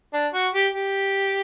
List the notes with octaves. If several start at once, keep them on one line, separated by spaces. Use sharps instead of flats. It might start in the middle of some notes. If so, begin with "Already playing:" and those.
D4
F#4
G4
G4